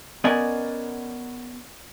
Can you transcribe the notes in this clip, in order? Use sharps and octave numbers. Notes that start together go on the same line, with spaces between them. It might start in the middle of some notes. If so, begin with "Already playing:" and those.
B3 C#4 A#4 D5 D#5 G#5